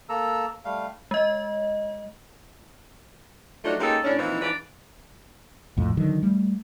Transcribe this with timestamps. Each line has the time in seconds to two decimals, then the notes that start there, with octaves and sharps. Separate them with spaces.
0.09 A#3 A4 A#5 E6
0.65 G3 A3 F5
1.11 G#3 D#5
3.65 F3 F#3 A3 D4 D#4 F#4
3.80 G#3 A#3 C#4 D#4 G4 A4
4.04 A2 C#4 D4
4.18 A#2 E3 F3 C4 D#4 E4
4.41 G#2 E3 F3 D4 B4 D5
5.77 A#1 F2 A2
5.97 D3 D#3 F#3
6.23 G3 A3